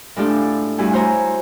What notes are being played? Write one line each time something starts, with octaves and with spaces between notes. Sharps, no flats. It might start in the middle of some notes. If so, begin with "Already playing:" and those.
A2 G#3 D4 F4 G4 A4
G2 A3 E4 F#4 G#5
F#4 C5 C#5 G#5 A#5